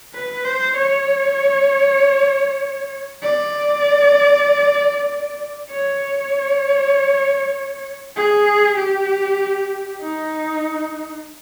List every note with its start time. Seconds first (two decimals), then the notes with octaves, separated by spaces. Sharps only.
0.14 B4
0.45 C5
0.76 C#5
3.23 D5
5.70 C#5
8.16 G#4
8.78 G4
10.01 D#4